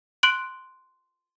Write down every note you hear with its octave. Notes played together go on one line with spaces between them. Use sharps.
C6 F#6 D7 F#7